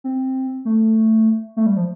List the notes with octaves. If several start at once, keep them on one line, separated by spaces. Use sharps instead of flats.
C4
A3
A3
G3
F3